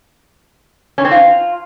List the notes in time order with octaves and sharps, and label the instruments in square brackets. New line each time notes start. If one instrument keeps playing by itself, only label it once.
[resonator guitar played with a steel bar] C#4
C4
F4